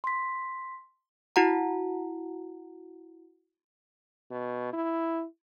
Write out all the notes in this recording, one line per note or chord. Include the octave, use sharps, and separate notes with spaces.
C6 B6
E4 F#4 F#5 A#5
B2
E4